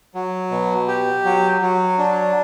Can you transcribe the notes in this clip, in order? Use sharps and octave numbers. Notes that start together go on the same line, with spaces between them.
F#3
B2
G4
F#3
F#3
D4